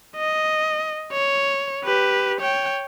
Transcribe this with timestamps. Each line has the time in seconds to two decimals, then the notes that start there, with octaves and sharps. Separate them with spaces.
0.16 D#5
1.13 C#5
1.85 G4 B4
2.41 C#5 G5